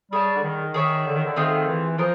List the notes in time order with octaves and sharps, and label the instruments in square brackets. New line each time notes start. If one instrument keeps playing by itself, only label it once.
[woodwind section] G3 [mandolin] G#4 C#5 F#5 A5
[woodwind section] D3
D#3
[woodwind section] D#3 [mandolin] G#4 C#5 E5
[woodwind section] D3
D#3
D3
[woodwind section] D#3 [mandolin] A3 C4 F4 G#4
[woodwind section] E3
[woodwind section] F3 [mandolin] F4 A#4 D#5